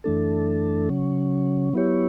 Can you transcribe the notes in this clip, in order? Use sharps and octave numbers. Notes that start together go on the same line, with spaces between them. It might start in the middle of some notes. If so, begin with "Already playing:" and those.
F#2 E3 A3 D4 A4
C#3 F#3 C#4
F#3 B3 E4 G4 C#5